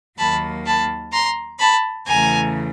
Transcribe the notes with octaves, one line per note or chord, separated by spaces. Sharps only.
D#2 D#3 F#3 A#3 A5 B5
A5 B5
A#5 C6
A5 B5
E2 C#3 E3 A3 G#5 A#5